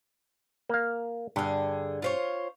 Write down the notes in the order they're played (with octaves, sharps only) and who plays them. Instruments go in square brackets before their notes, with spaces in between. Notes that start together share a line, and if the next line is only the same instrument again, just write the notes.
[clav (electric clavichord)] A#3 F5
[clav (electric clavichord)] G2 [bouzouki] D3 G#4
[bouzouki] F4 C5 C#5